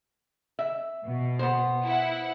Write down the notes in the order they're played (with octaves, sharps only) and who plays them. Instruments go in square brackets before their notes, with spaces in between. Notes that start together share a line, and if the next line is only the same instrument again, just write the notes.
[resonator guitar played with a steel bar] E5
[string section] B2
[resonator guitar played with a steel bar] B3 C5
[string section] E4 F#5